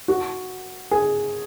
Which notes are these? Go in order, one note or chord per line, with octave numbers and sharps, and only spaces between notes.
F#4
G#4